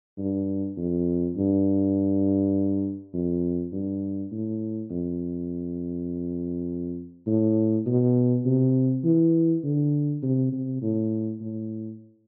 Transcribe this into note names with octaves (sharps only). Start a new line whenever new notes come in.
G2
F2
G2
F2
G2
A2
F2
A2
B2
C3
E3
D3
C3
C3
A2
A2